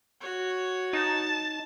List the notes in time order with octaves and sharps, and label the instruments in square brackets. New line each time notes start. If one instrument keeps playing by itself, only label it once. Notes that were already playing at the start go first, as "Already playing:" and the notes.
[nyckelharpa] F#4 C#5
[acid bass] D#4 [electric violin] A5